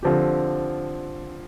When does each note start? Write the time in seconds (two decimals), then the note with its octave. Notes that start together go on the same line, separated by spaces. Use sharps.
0.03 D3 F3 C4 G4